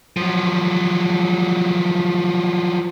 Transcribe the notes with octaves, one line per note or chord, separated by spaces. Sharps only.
F3 F#3